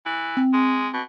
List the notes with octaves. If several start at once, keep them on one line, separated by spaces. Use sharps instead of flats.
E3
C4
G#3
B2